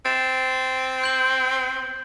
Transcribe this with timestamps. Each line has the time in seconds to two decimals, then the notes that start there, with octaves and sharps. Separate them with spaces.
0.05 C4 A6 E7
1.03 G6 F#7